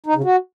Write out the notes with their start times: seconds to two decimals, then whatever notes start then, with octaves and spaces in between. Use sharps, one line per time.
0.06 D#4
0.15 C#3
0.24 F#4